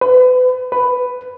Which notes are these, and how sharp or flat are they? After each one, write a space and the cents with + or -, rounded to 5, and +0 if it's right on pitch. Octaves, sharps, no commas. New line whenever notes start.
B4 +35
B4 +10